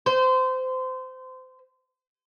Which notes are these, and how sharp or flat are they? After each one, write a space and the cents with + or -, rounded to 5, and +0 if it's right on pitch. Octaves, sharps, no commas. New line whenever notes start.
C5 -25